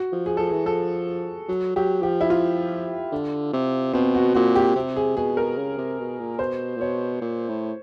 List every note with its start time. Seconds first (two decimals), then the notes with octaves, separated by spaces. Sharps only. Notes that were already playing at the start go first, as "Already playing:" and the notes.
Already playing: F#4
0.12 F3
0.26 G#4
0.37 F3 A4
0.49 E3 G#4
0.66 F3 A4
1.49 F#3
1.76 F#3 G4
2.02 F3 G4
2.21 E4
2.30 F4
3.12 D3
3.53 C3
3.93 B2 C4
4.15 F#4
4.34 A#2 F#4
4.56 G4
4.76 C3
4.96 G#4
5.17 B2 G#4
5.37 A#4
5.57 C#3
5.78 C3
5.99 B2
6.19 A#2
6.39 B2 C5
6.76 A#2
6.80 B2 C#5
7.21 A#2
7.48 A2